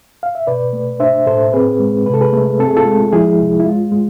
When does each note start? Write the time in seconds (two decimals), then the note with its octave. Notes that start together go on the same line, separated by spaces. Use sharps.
0.23 F5
0.35 E5
0.47 B2 B4 D5
0.73 A3
1.00 D4 C5 E5
1.27 A2 A4 C5
1.53 C4 G#4 B4
1.79 G#3
2.06 C3 B4
2.14 A4
2.21 G#4 B4
2.33 A3
2.59 C4 A4
2.67 G#4
2.77 F4 A4
2.85 G#3
3.12 F3 E4 G#4
3.39 C2
3.60 E4
3.66 G#3 F4
3.92 G#3